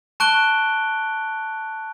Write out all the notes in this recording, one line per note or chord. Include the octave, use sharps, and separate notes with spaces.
A5 C#6 F#6 D7 G7